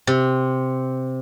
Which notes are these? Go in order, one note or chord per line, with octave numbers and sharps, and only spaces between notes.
C3